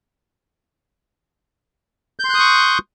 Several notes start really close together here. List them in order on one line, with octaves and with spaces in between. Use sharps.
G6 C6 F#6 D#6 C#6